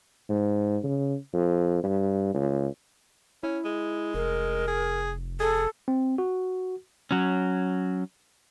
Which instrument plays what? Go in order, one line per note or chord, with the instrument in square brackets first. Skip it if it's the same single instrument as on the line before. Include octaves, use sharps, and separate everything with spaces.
[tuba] G#2
C#3
F2
G2
C#2
[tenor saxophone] C#4 [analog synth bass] E4
[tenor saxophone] G#3
[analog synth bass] F1 [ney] A#4
[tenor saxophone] G#4
[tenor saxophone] G#4 [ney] A4
[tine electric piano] C4
F#4
[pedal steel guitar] F#3 C#4